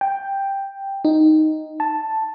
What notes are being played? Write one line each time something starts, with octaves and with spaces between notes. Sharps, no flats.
G5
D#4
A5